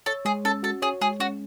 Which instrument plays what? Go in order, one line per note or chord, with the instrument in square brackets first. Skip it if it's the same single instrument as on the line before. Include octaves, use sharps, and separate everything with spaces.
[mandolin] A4 [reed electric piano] C#5
[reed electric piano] G#3 [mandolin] G#4
[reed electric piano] C#4 [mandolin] A4
[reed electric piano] F#4 [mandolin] A4
[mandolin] G#4 [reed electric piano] C#5
[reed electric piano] G#3 [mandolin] G#4
[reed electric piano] C#4 [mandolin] F#4